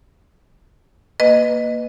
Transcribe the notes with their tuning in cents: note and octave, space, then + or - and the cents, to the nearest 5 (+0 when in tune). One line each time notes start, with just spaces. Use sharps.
A#3 +10 B4 +10 D#5 -15